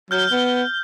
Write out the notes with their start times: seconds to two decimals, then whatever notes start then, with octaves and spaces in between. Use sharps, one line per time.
0.11 F#3 F6 G6 G7
0.31 B3